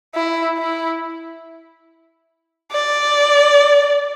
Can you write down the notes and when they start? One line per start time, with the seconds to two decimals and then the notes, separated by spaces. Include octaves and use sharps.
0.15 E4
0.58 E4
2.72 D5